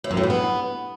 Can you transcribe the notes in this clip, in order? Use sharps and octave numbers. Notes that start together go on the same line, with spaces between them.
A2
F#2
A2
G2
B3